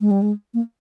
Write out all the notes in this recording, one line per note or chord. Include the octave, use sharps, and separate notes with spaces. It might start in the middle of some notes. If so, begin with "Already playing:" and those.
G#3
G3
G#3
A#3